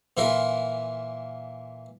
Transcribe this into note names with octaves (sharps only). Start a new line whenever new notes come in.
A#2 E3 E4 F4 A#4